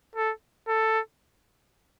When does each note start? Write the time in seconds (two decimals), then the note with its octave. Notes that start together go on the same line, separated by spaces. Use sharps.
0.15 A4
0.68 A4